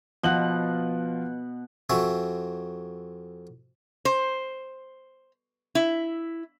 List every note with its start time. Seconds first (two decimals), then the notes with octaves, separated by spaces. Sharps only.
0.23 B2 F3 F4 F#5 F#7
1.89 F2 C4 F#4 E5 G#5 C#6
4.05 C5
5.75 E4